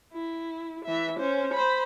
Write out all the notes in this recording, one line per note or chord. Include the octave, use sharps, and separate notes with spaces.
E4
E3 E5
C#4 C5
C5 B5